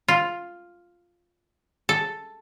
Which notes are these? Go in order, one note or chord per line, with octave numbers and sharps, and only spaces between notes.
F4
A4